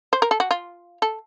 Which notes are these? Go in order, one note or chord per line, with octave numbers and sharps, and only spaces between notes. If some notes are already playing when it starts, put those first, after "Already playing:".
C5
A#4
A4
F#4
F4
A4